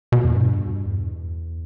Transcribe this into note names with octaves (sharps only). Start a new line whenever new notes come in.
B2
E2
G2
E2